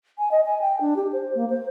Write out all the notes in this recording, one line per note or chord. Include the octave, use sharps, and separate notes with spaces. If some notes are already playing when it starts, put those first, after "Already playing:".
G#5
D#5
G#5
G5
D4
G4
C5
A#3
C5